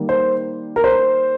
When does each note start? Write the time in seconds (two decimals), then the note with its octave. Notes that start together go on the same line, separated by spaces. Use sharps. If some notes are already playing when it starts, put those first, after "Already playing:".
Already playing: D#3 G3 A#3
0.09 C5
0.76 A#4
0.84 C5